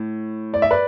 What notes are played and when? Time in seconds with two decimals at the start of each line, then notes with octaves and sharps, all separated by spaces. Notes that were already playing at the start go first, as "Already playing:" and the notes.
Already playing: A2
0.54 D5
0.62 E5
0.71 B4 D5